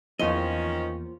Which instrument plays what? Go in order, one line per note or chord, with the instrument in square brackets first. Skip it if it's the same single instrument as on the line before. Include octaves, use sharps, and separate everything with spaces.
[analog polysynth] E2 F3 [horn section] D#3 C#4 [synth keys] A#3 F4 C5 [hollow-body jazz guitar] D#5